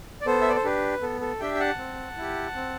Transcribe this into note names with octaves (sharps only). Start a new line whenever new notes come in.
D5
B3 A4 C5
E5
D5
C5
D4 G4 B4
B3 A4
A4
D4 G4 E5 G5
G5
F#5 A5
C4
E4 G4
C4